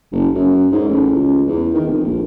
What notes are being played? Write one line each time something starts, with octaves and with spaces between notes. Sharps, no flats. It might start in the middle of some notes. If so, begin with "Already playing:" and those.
F#1
F#2
G#2
A1
C#2
E2
D#3
F1
A#1